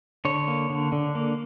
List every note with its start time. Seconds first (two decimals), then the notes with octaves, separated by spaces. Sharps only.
0.25 D3 C#5
0.48 A#3
0.70 D3
0.92 D3
1.15 A#3